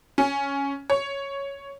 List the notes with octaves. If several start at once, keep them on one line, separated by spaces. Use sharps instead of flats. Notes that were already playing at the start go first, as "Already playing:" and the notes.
C#4
C#5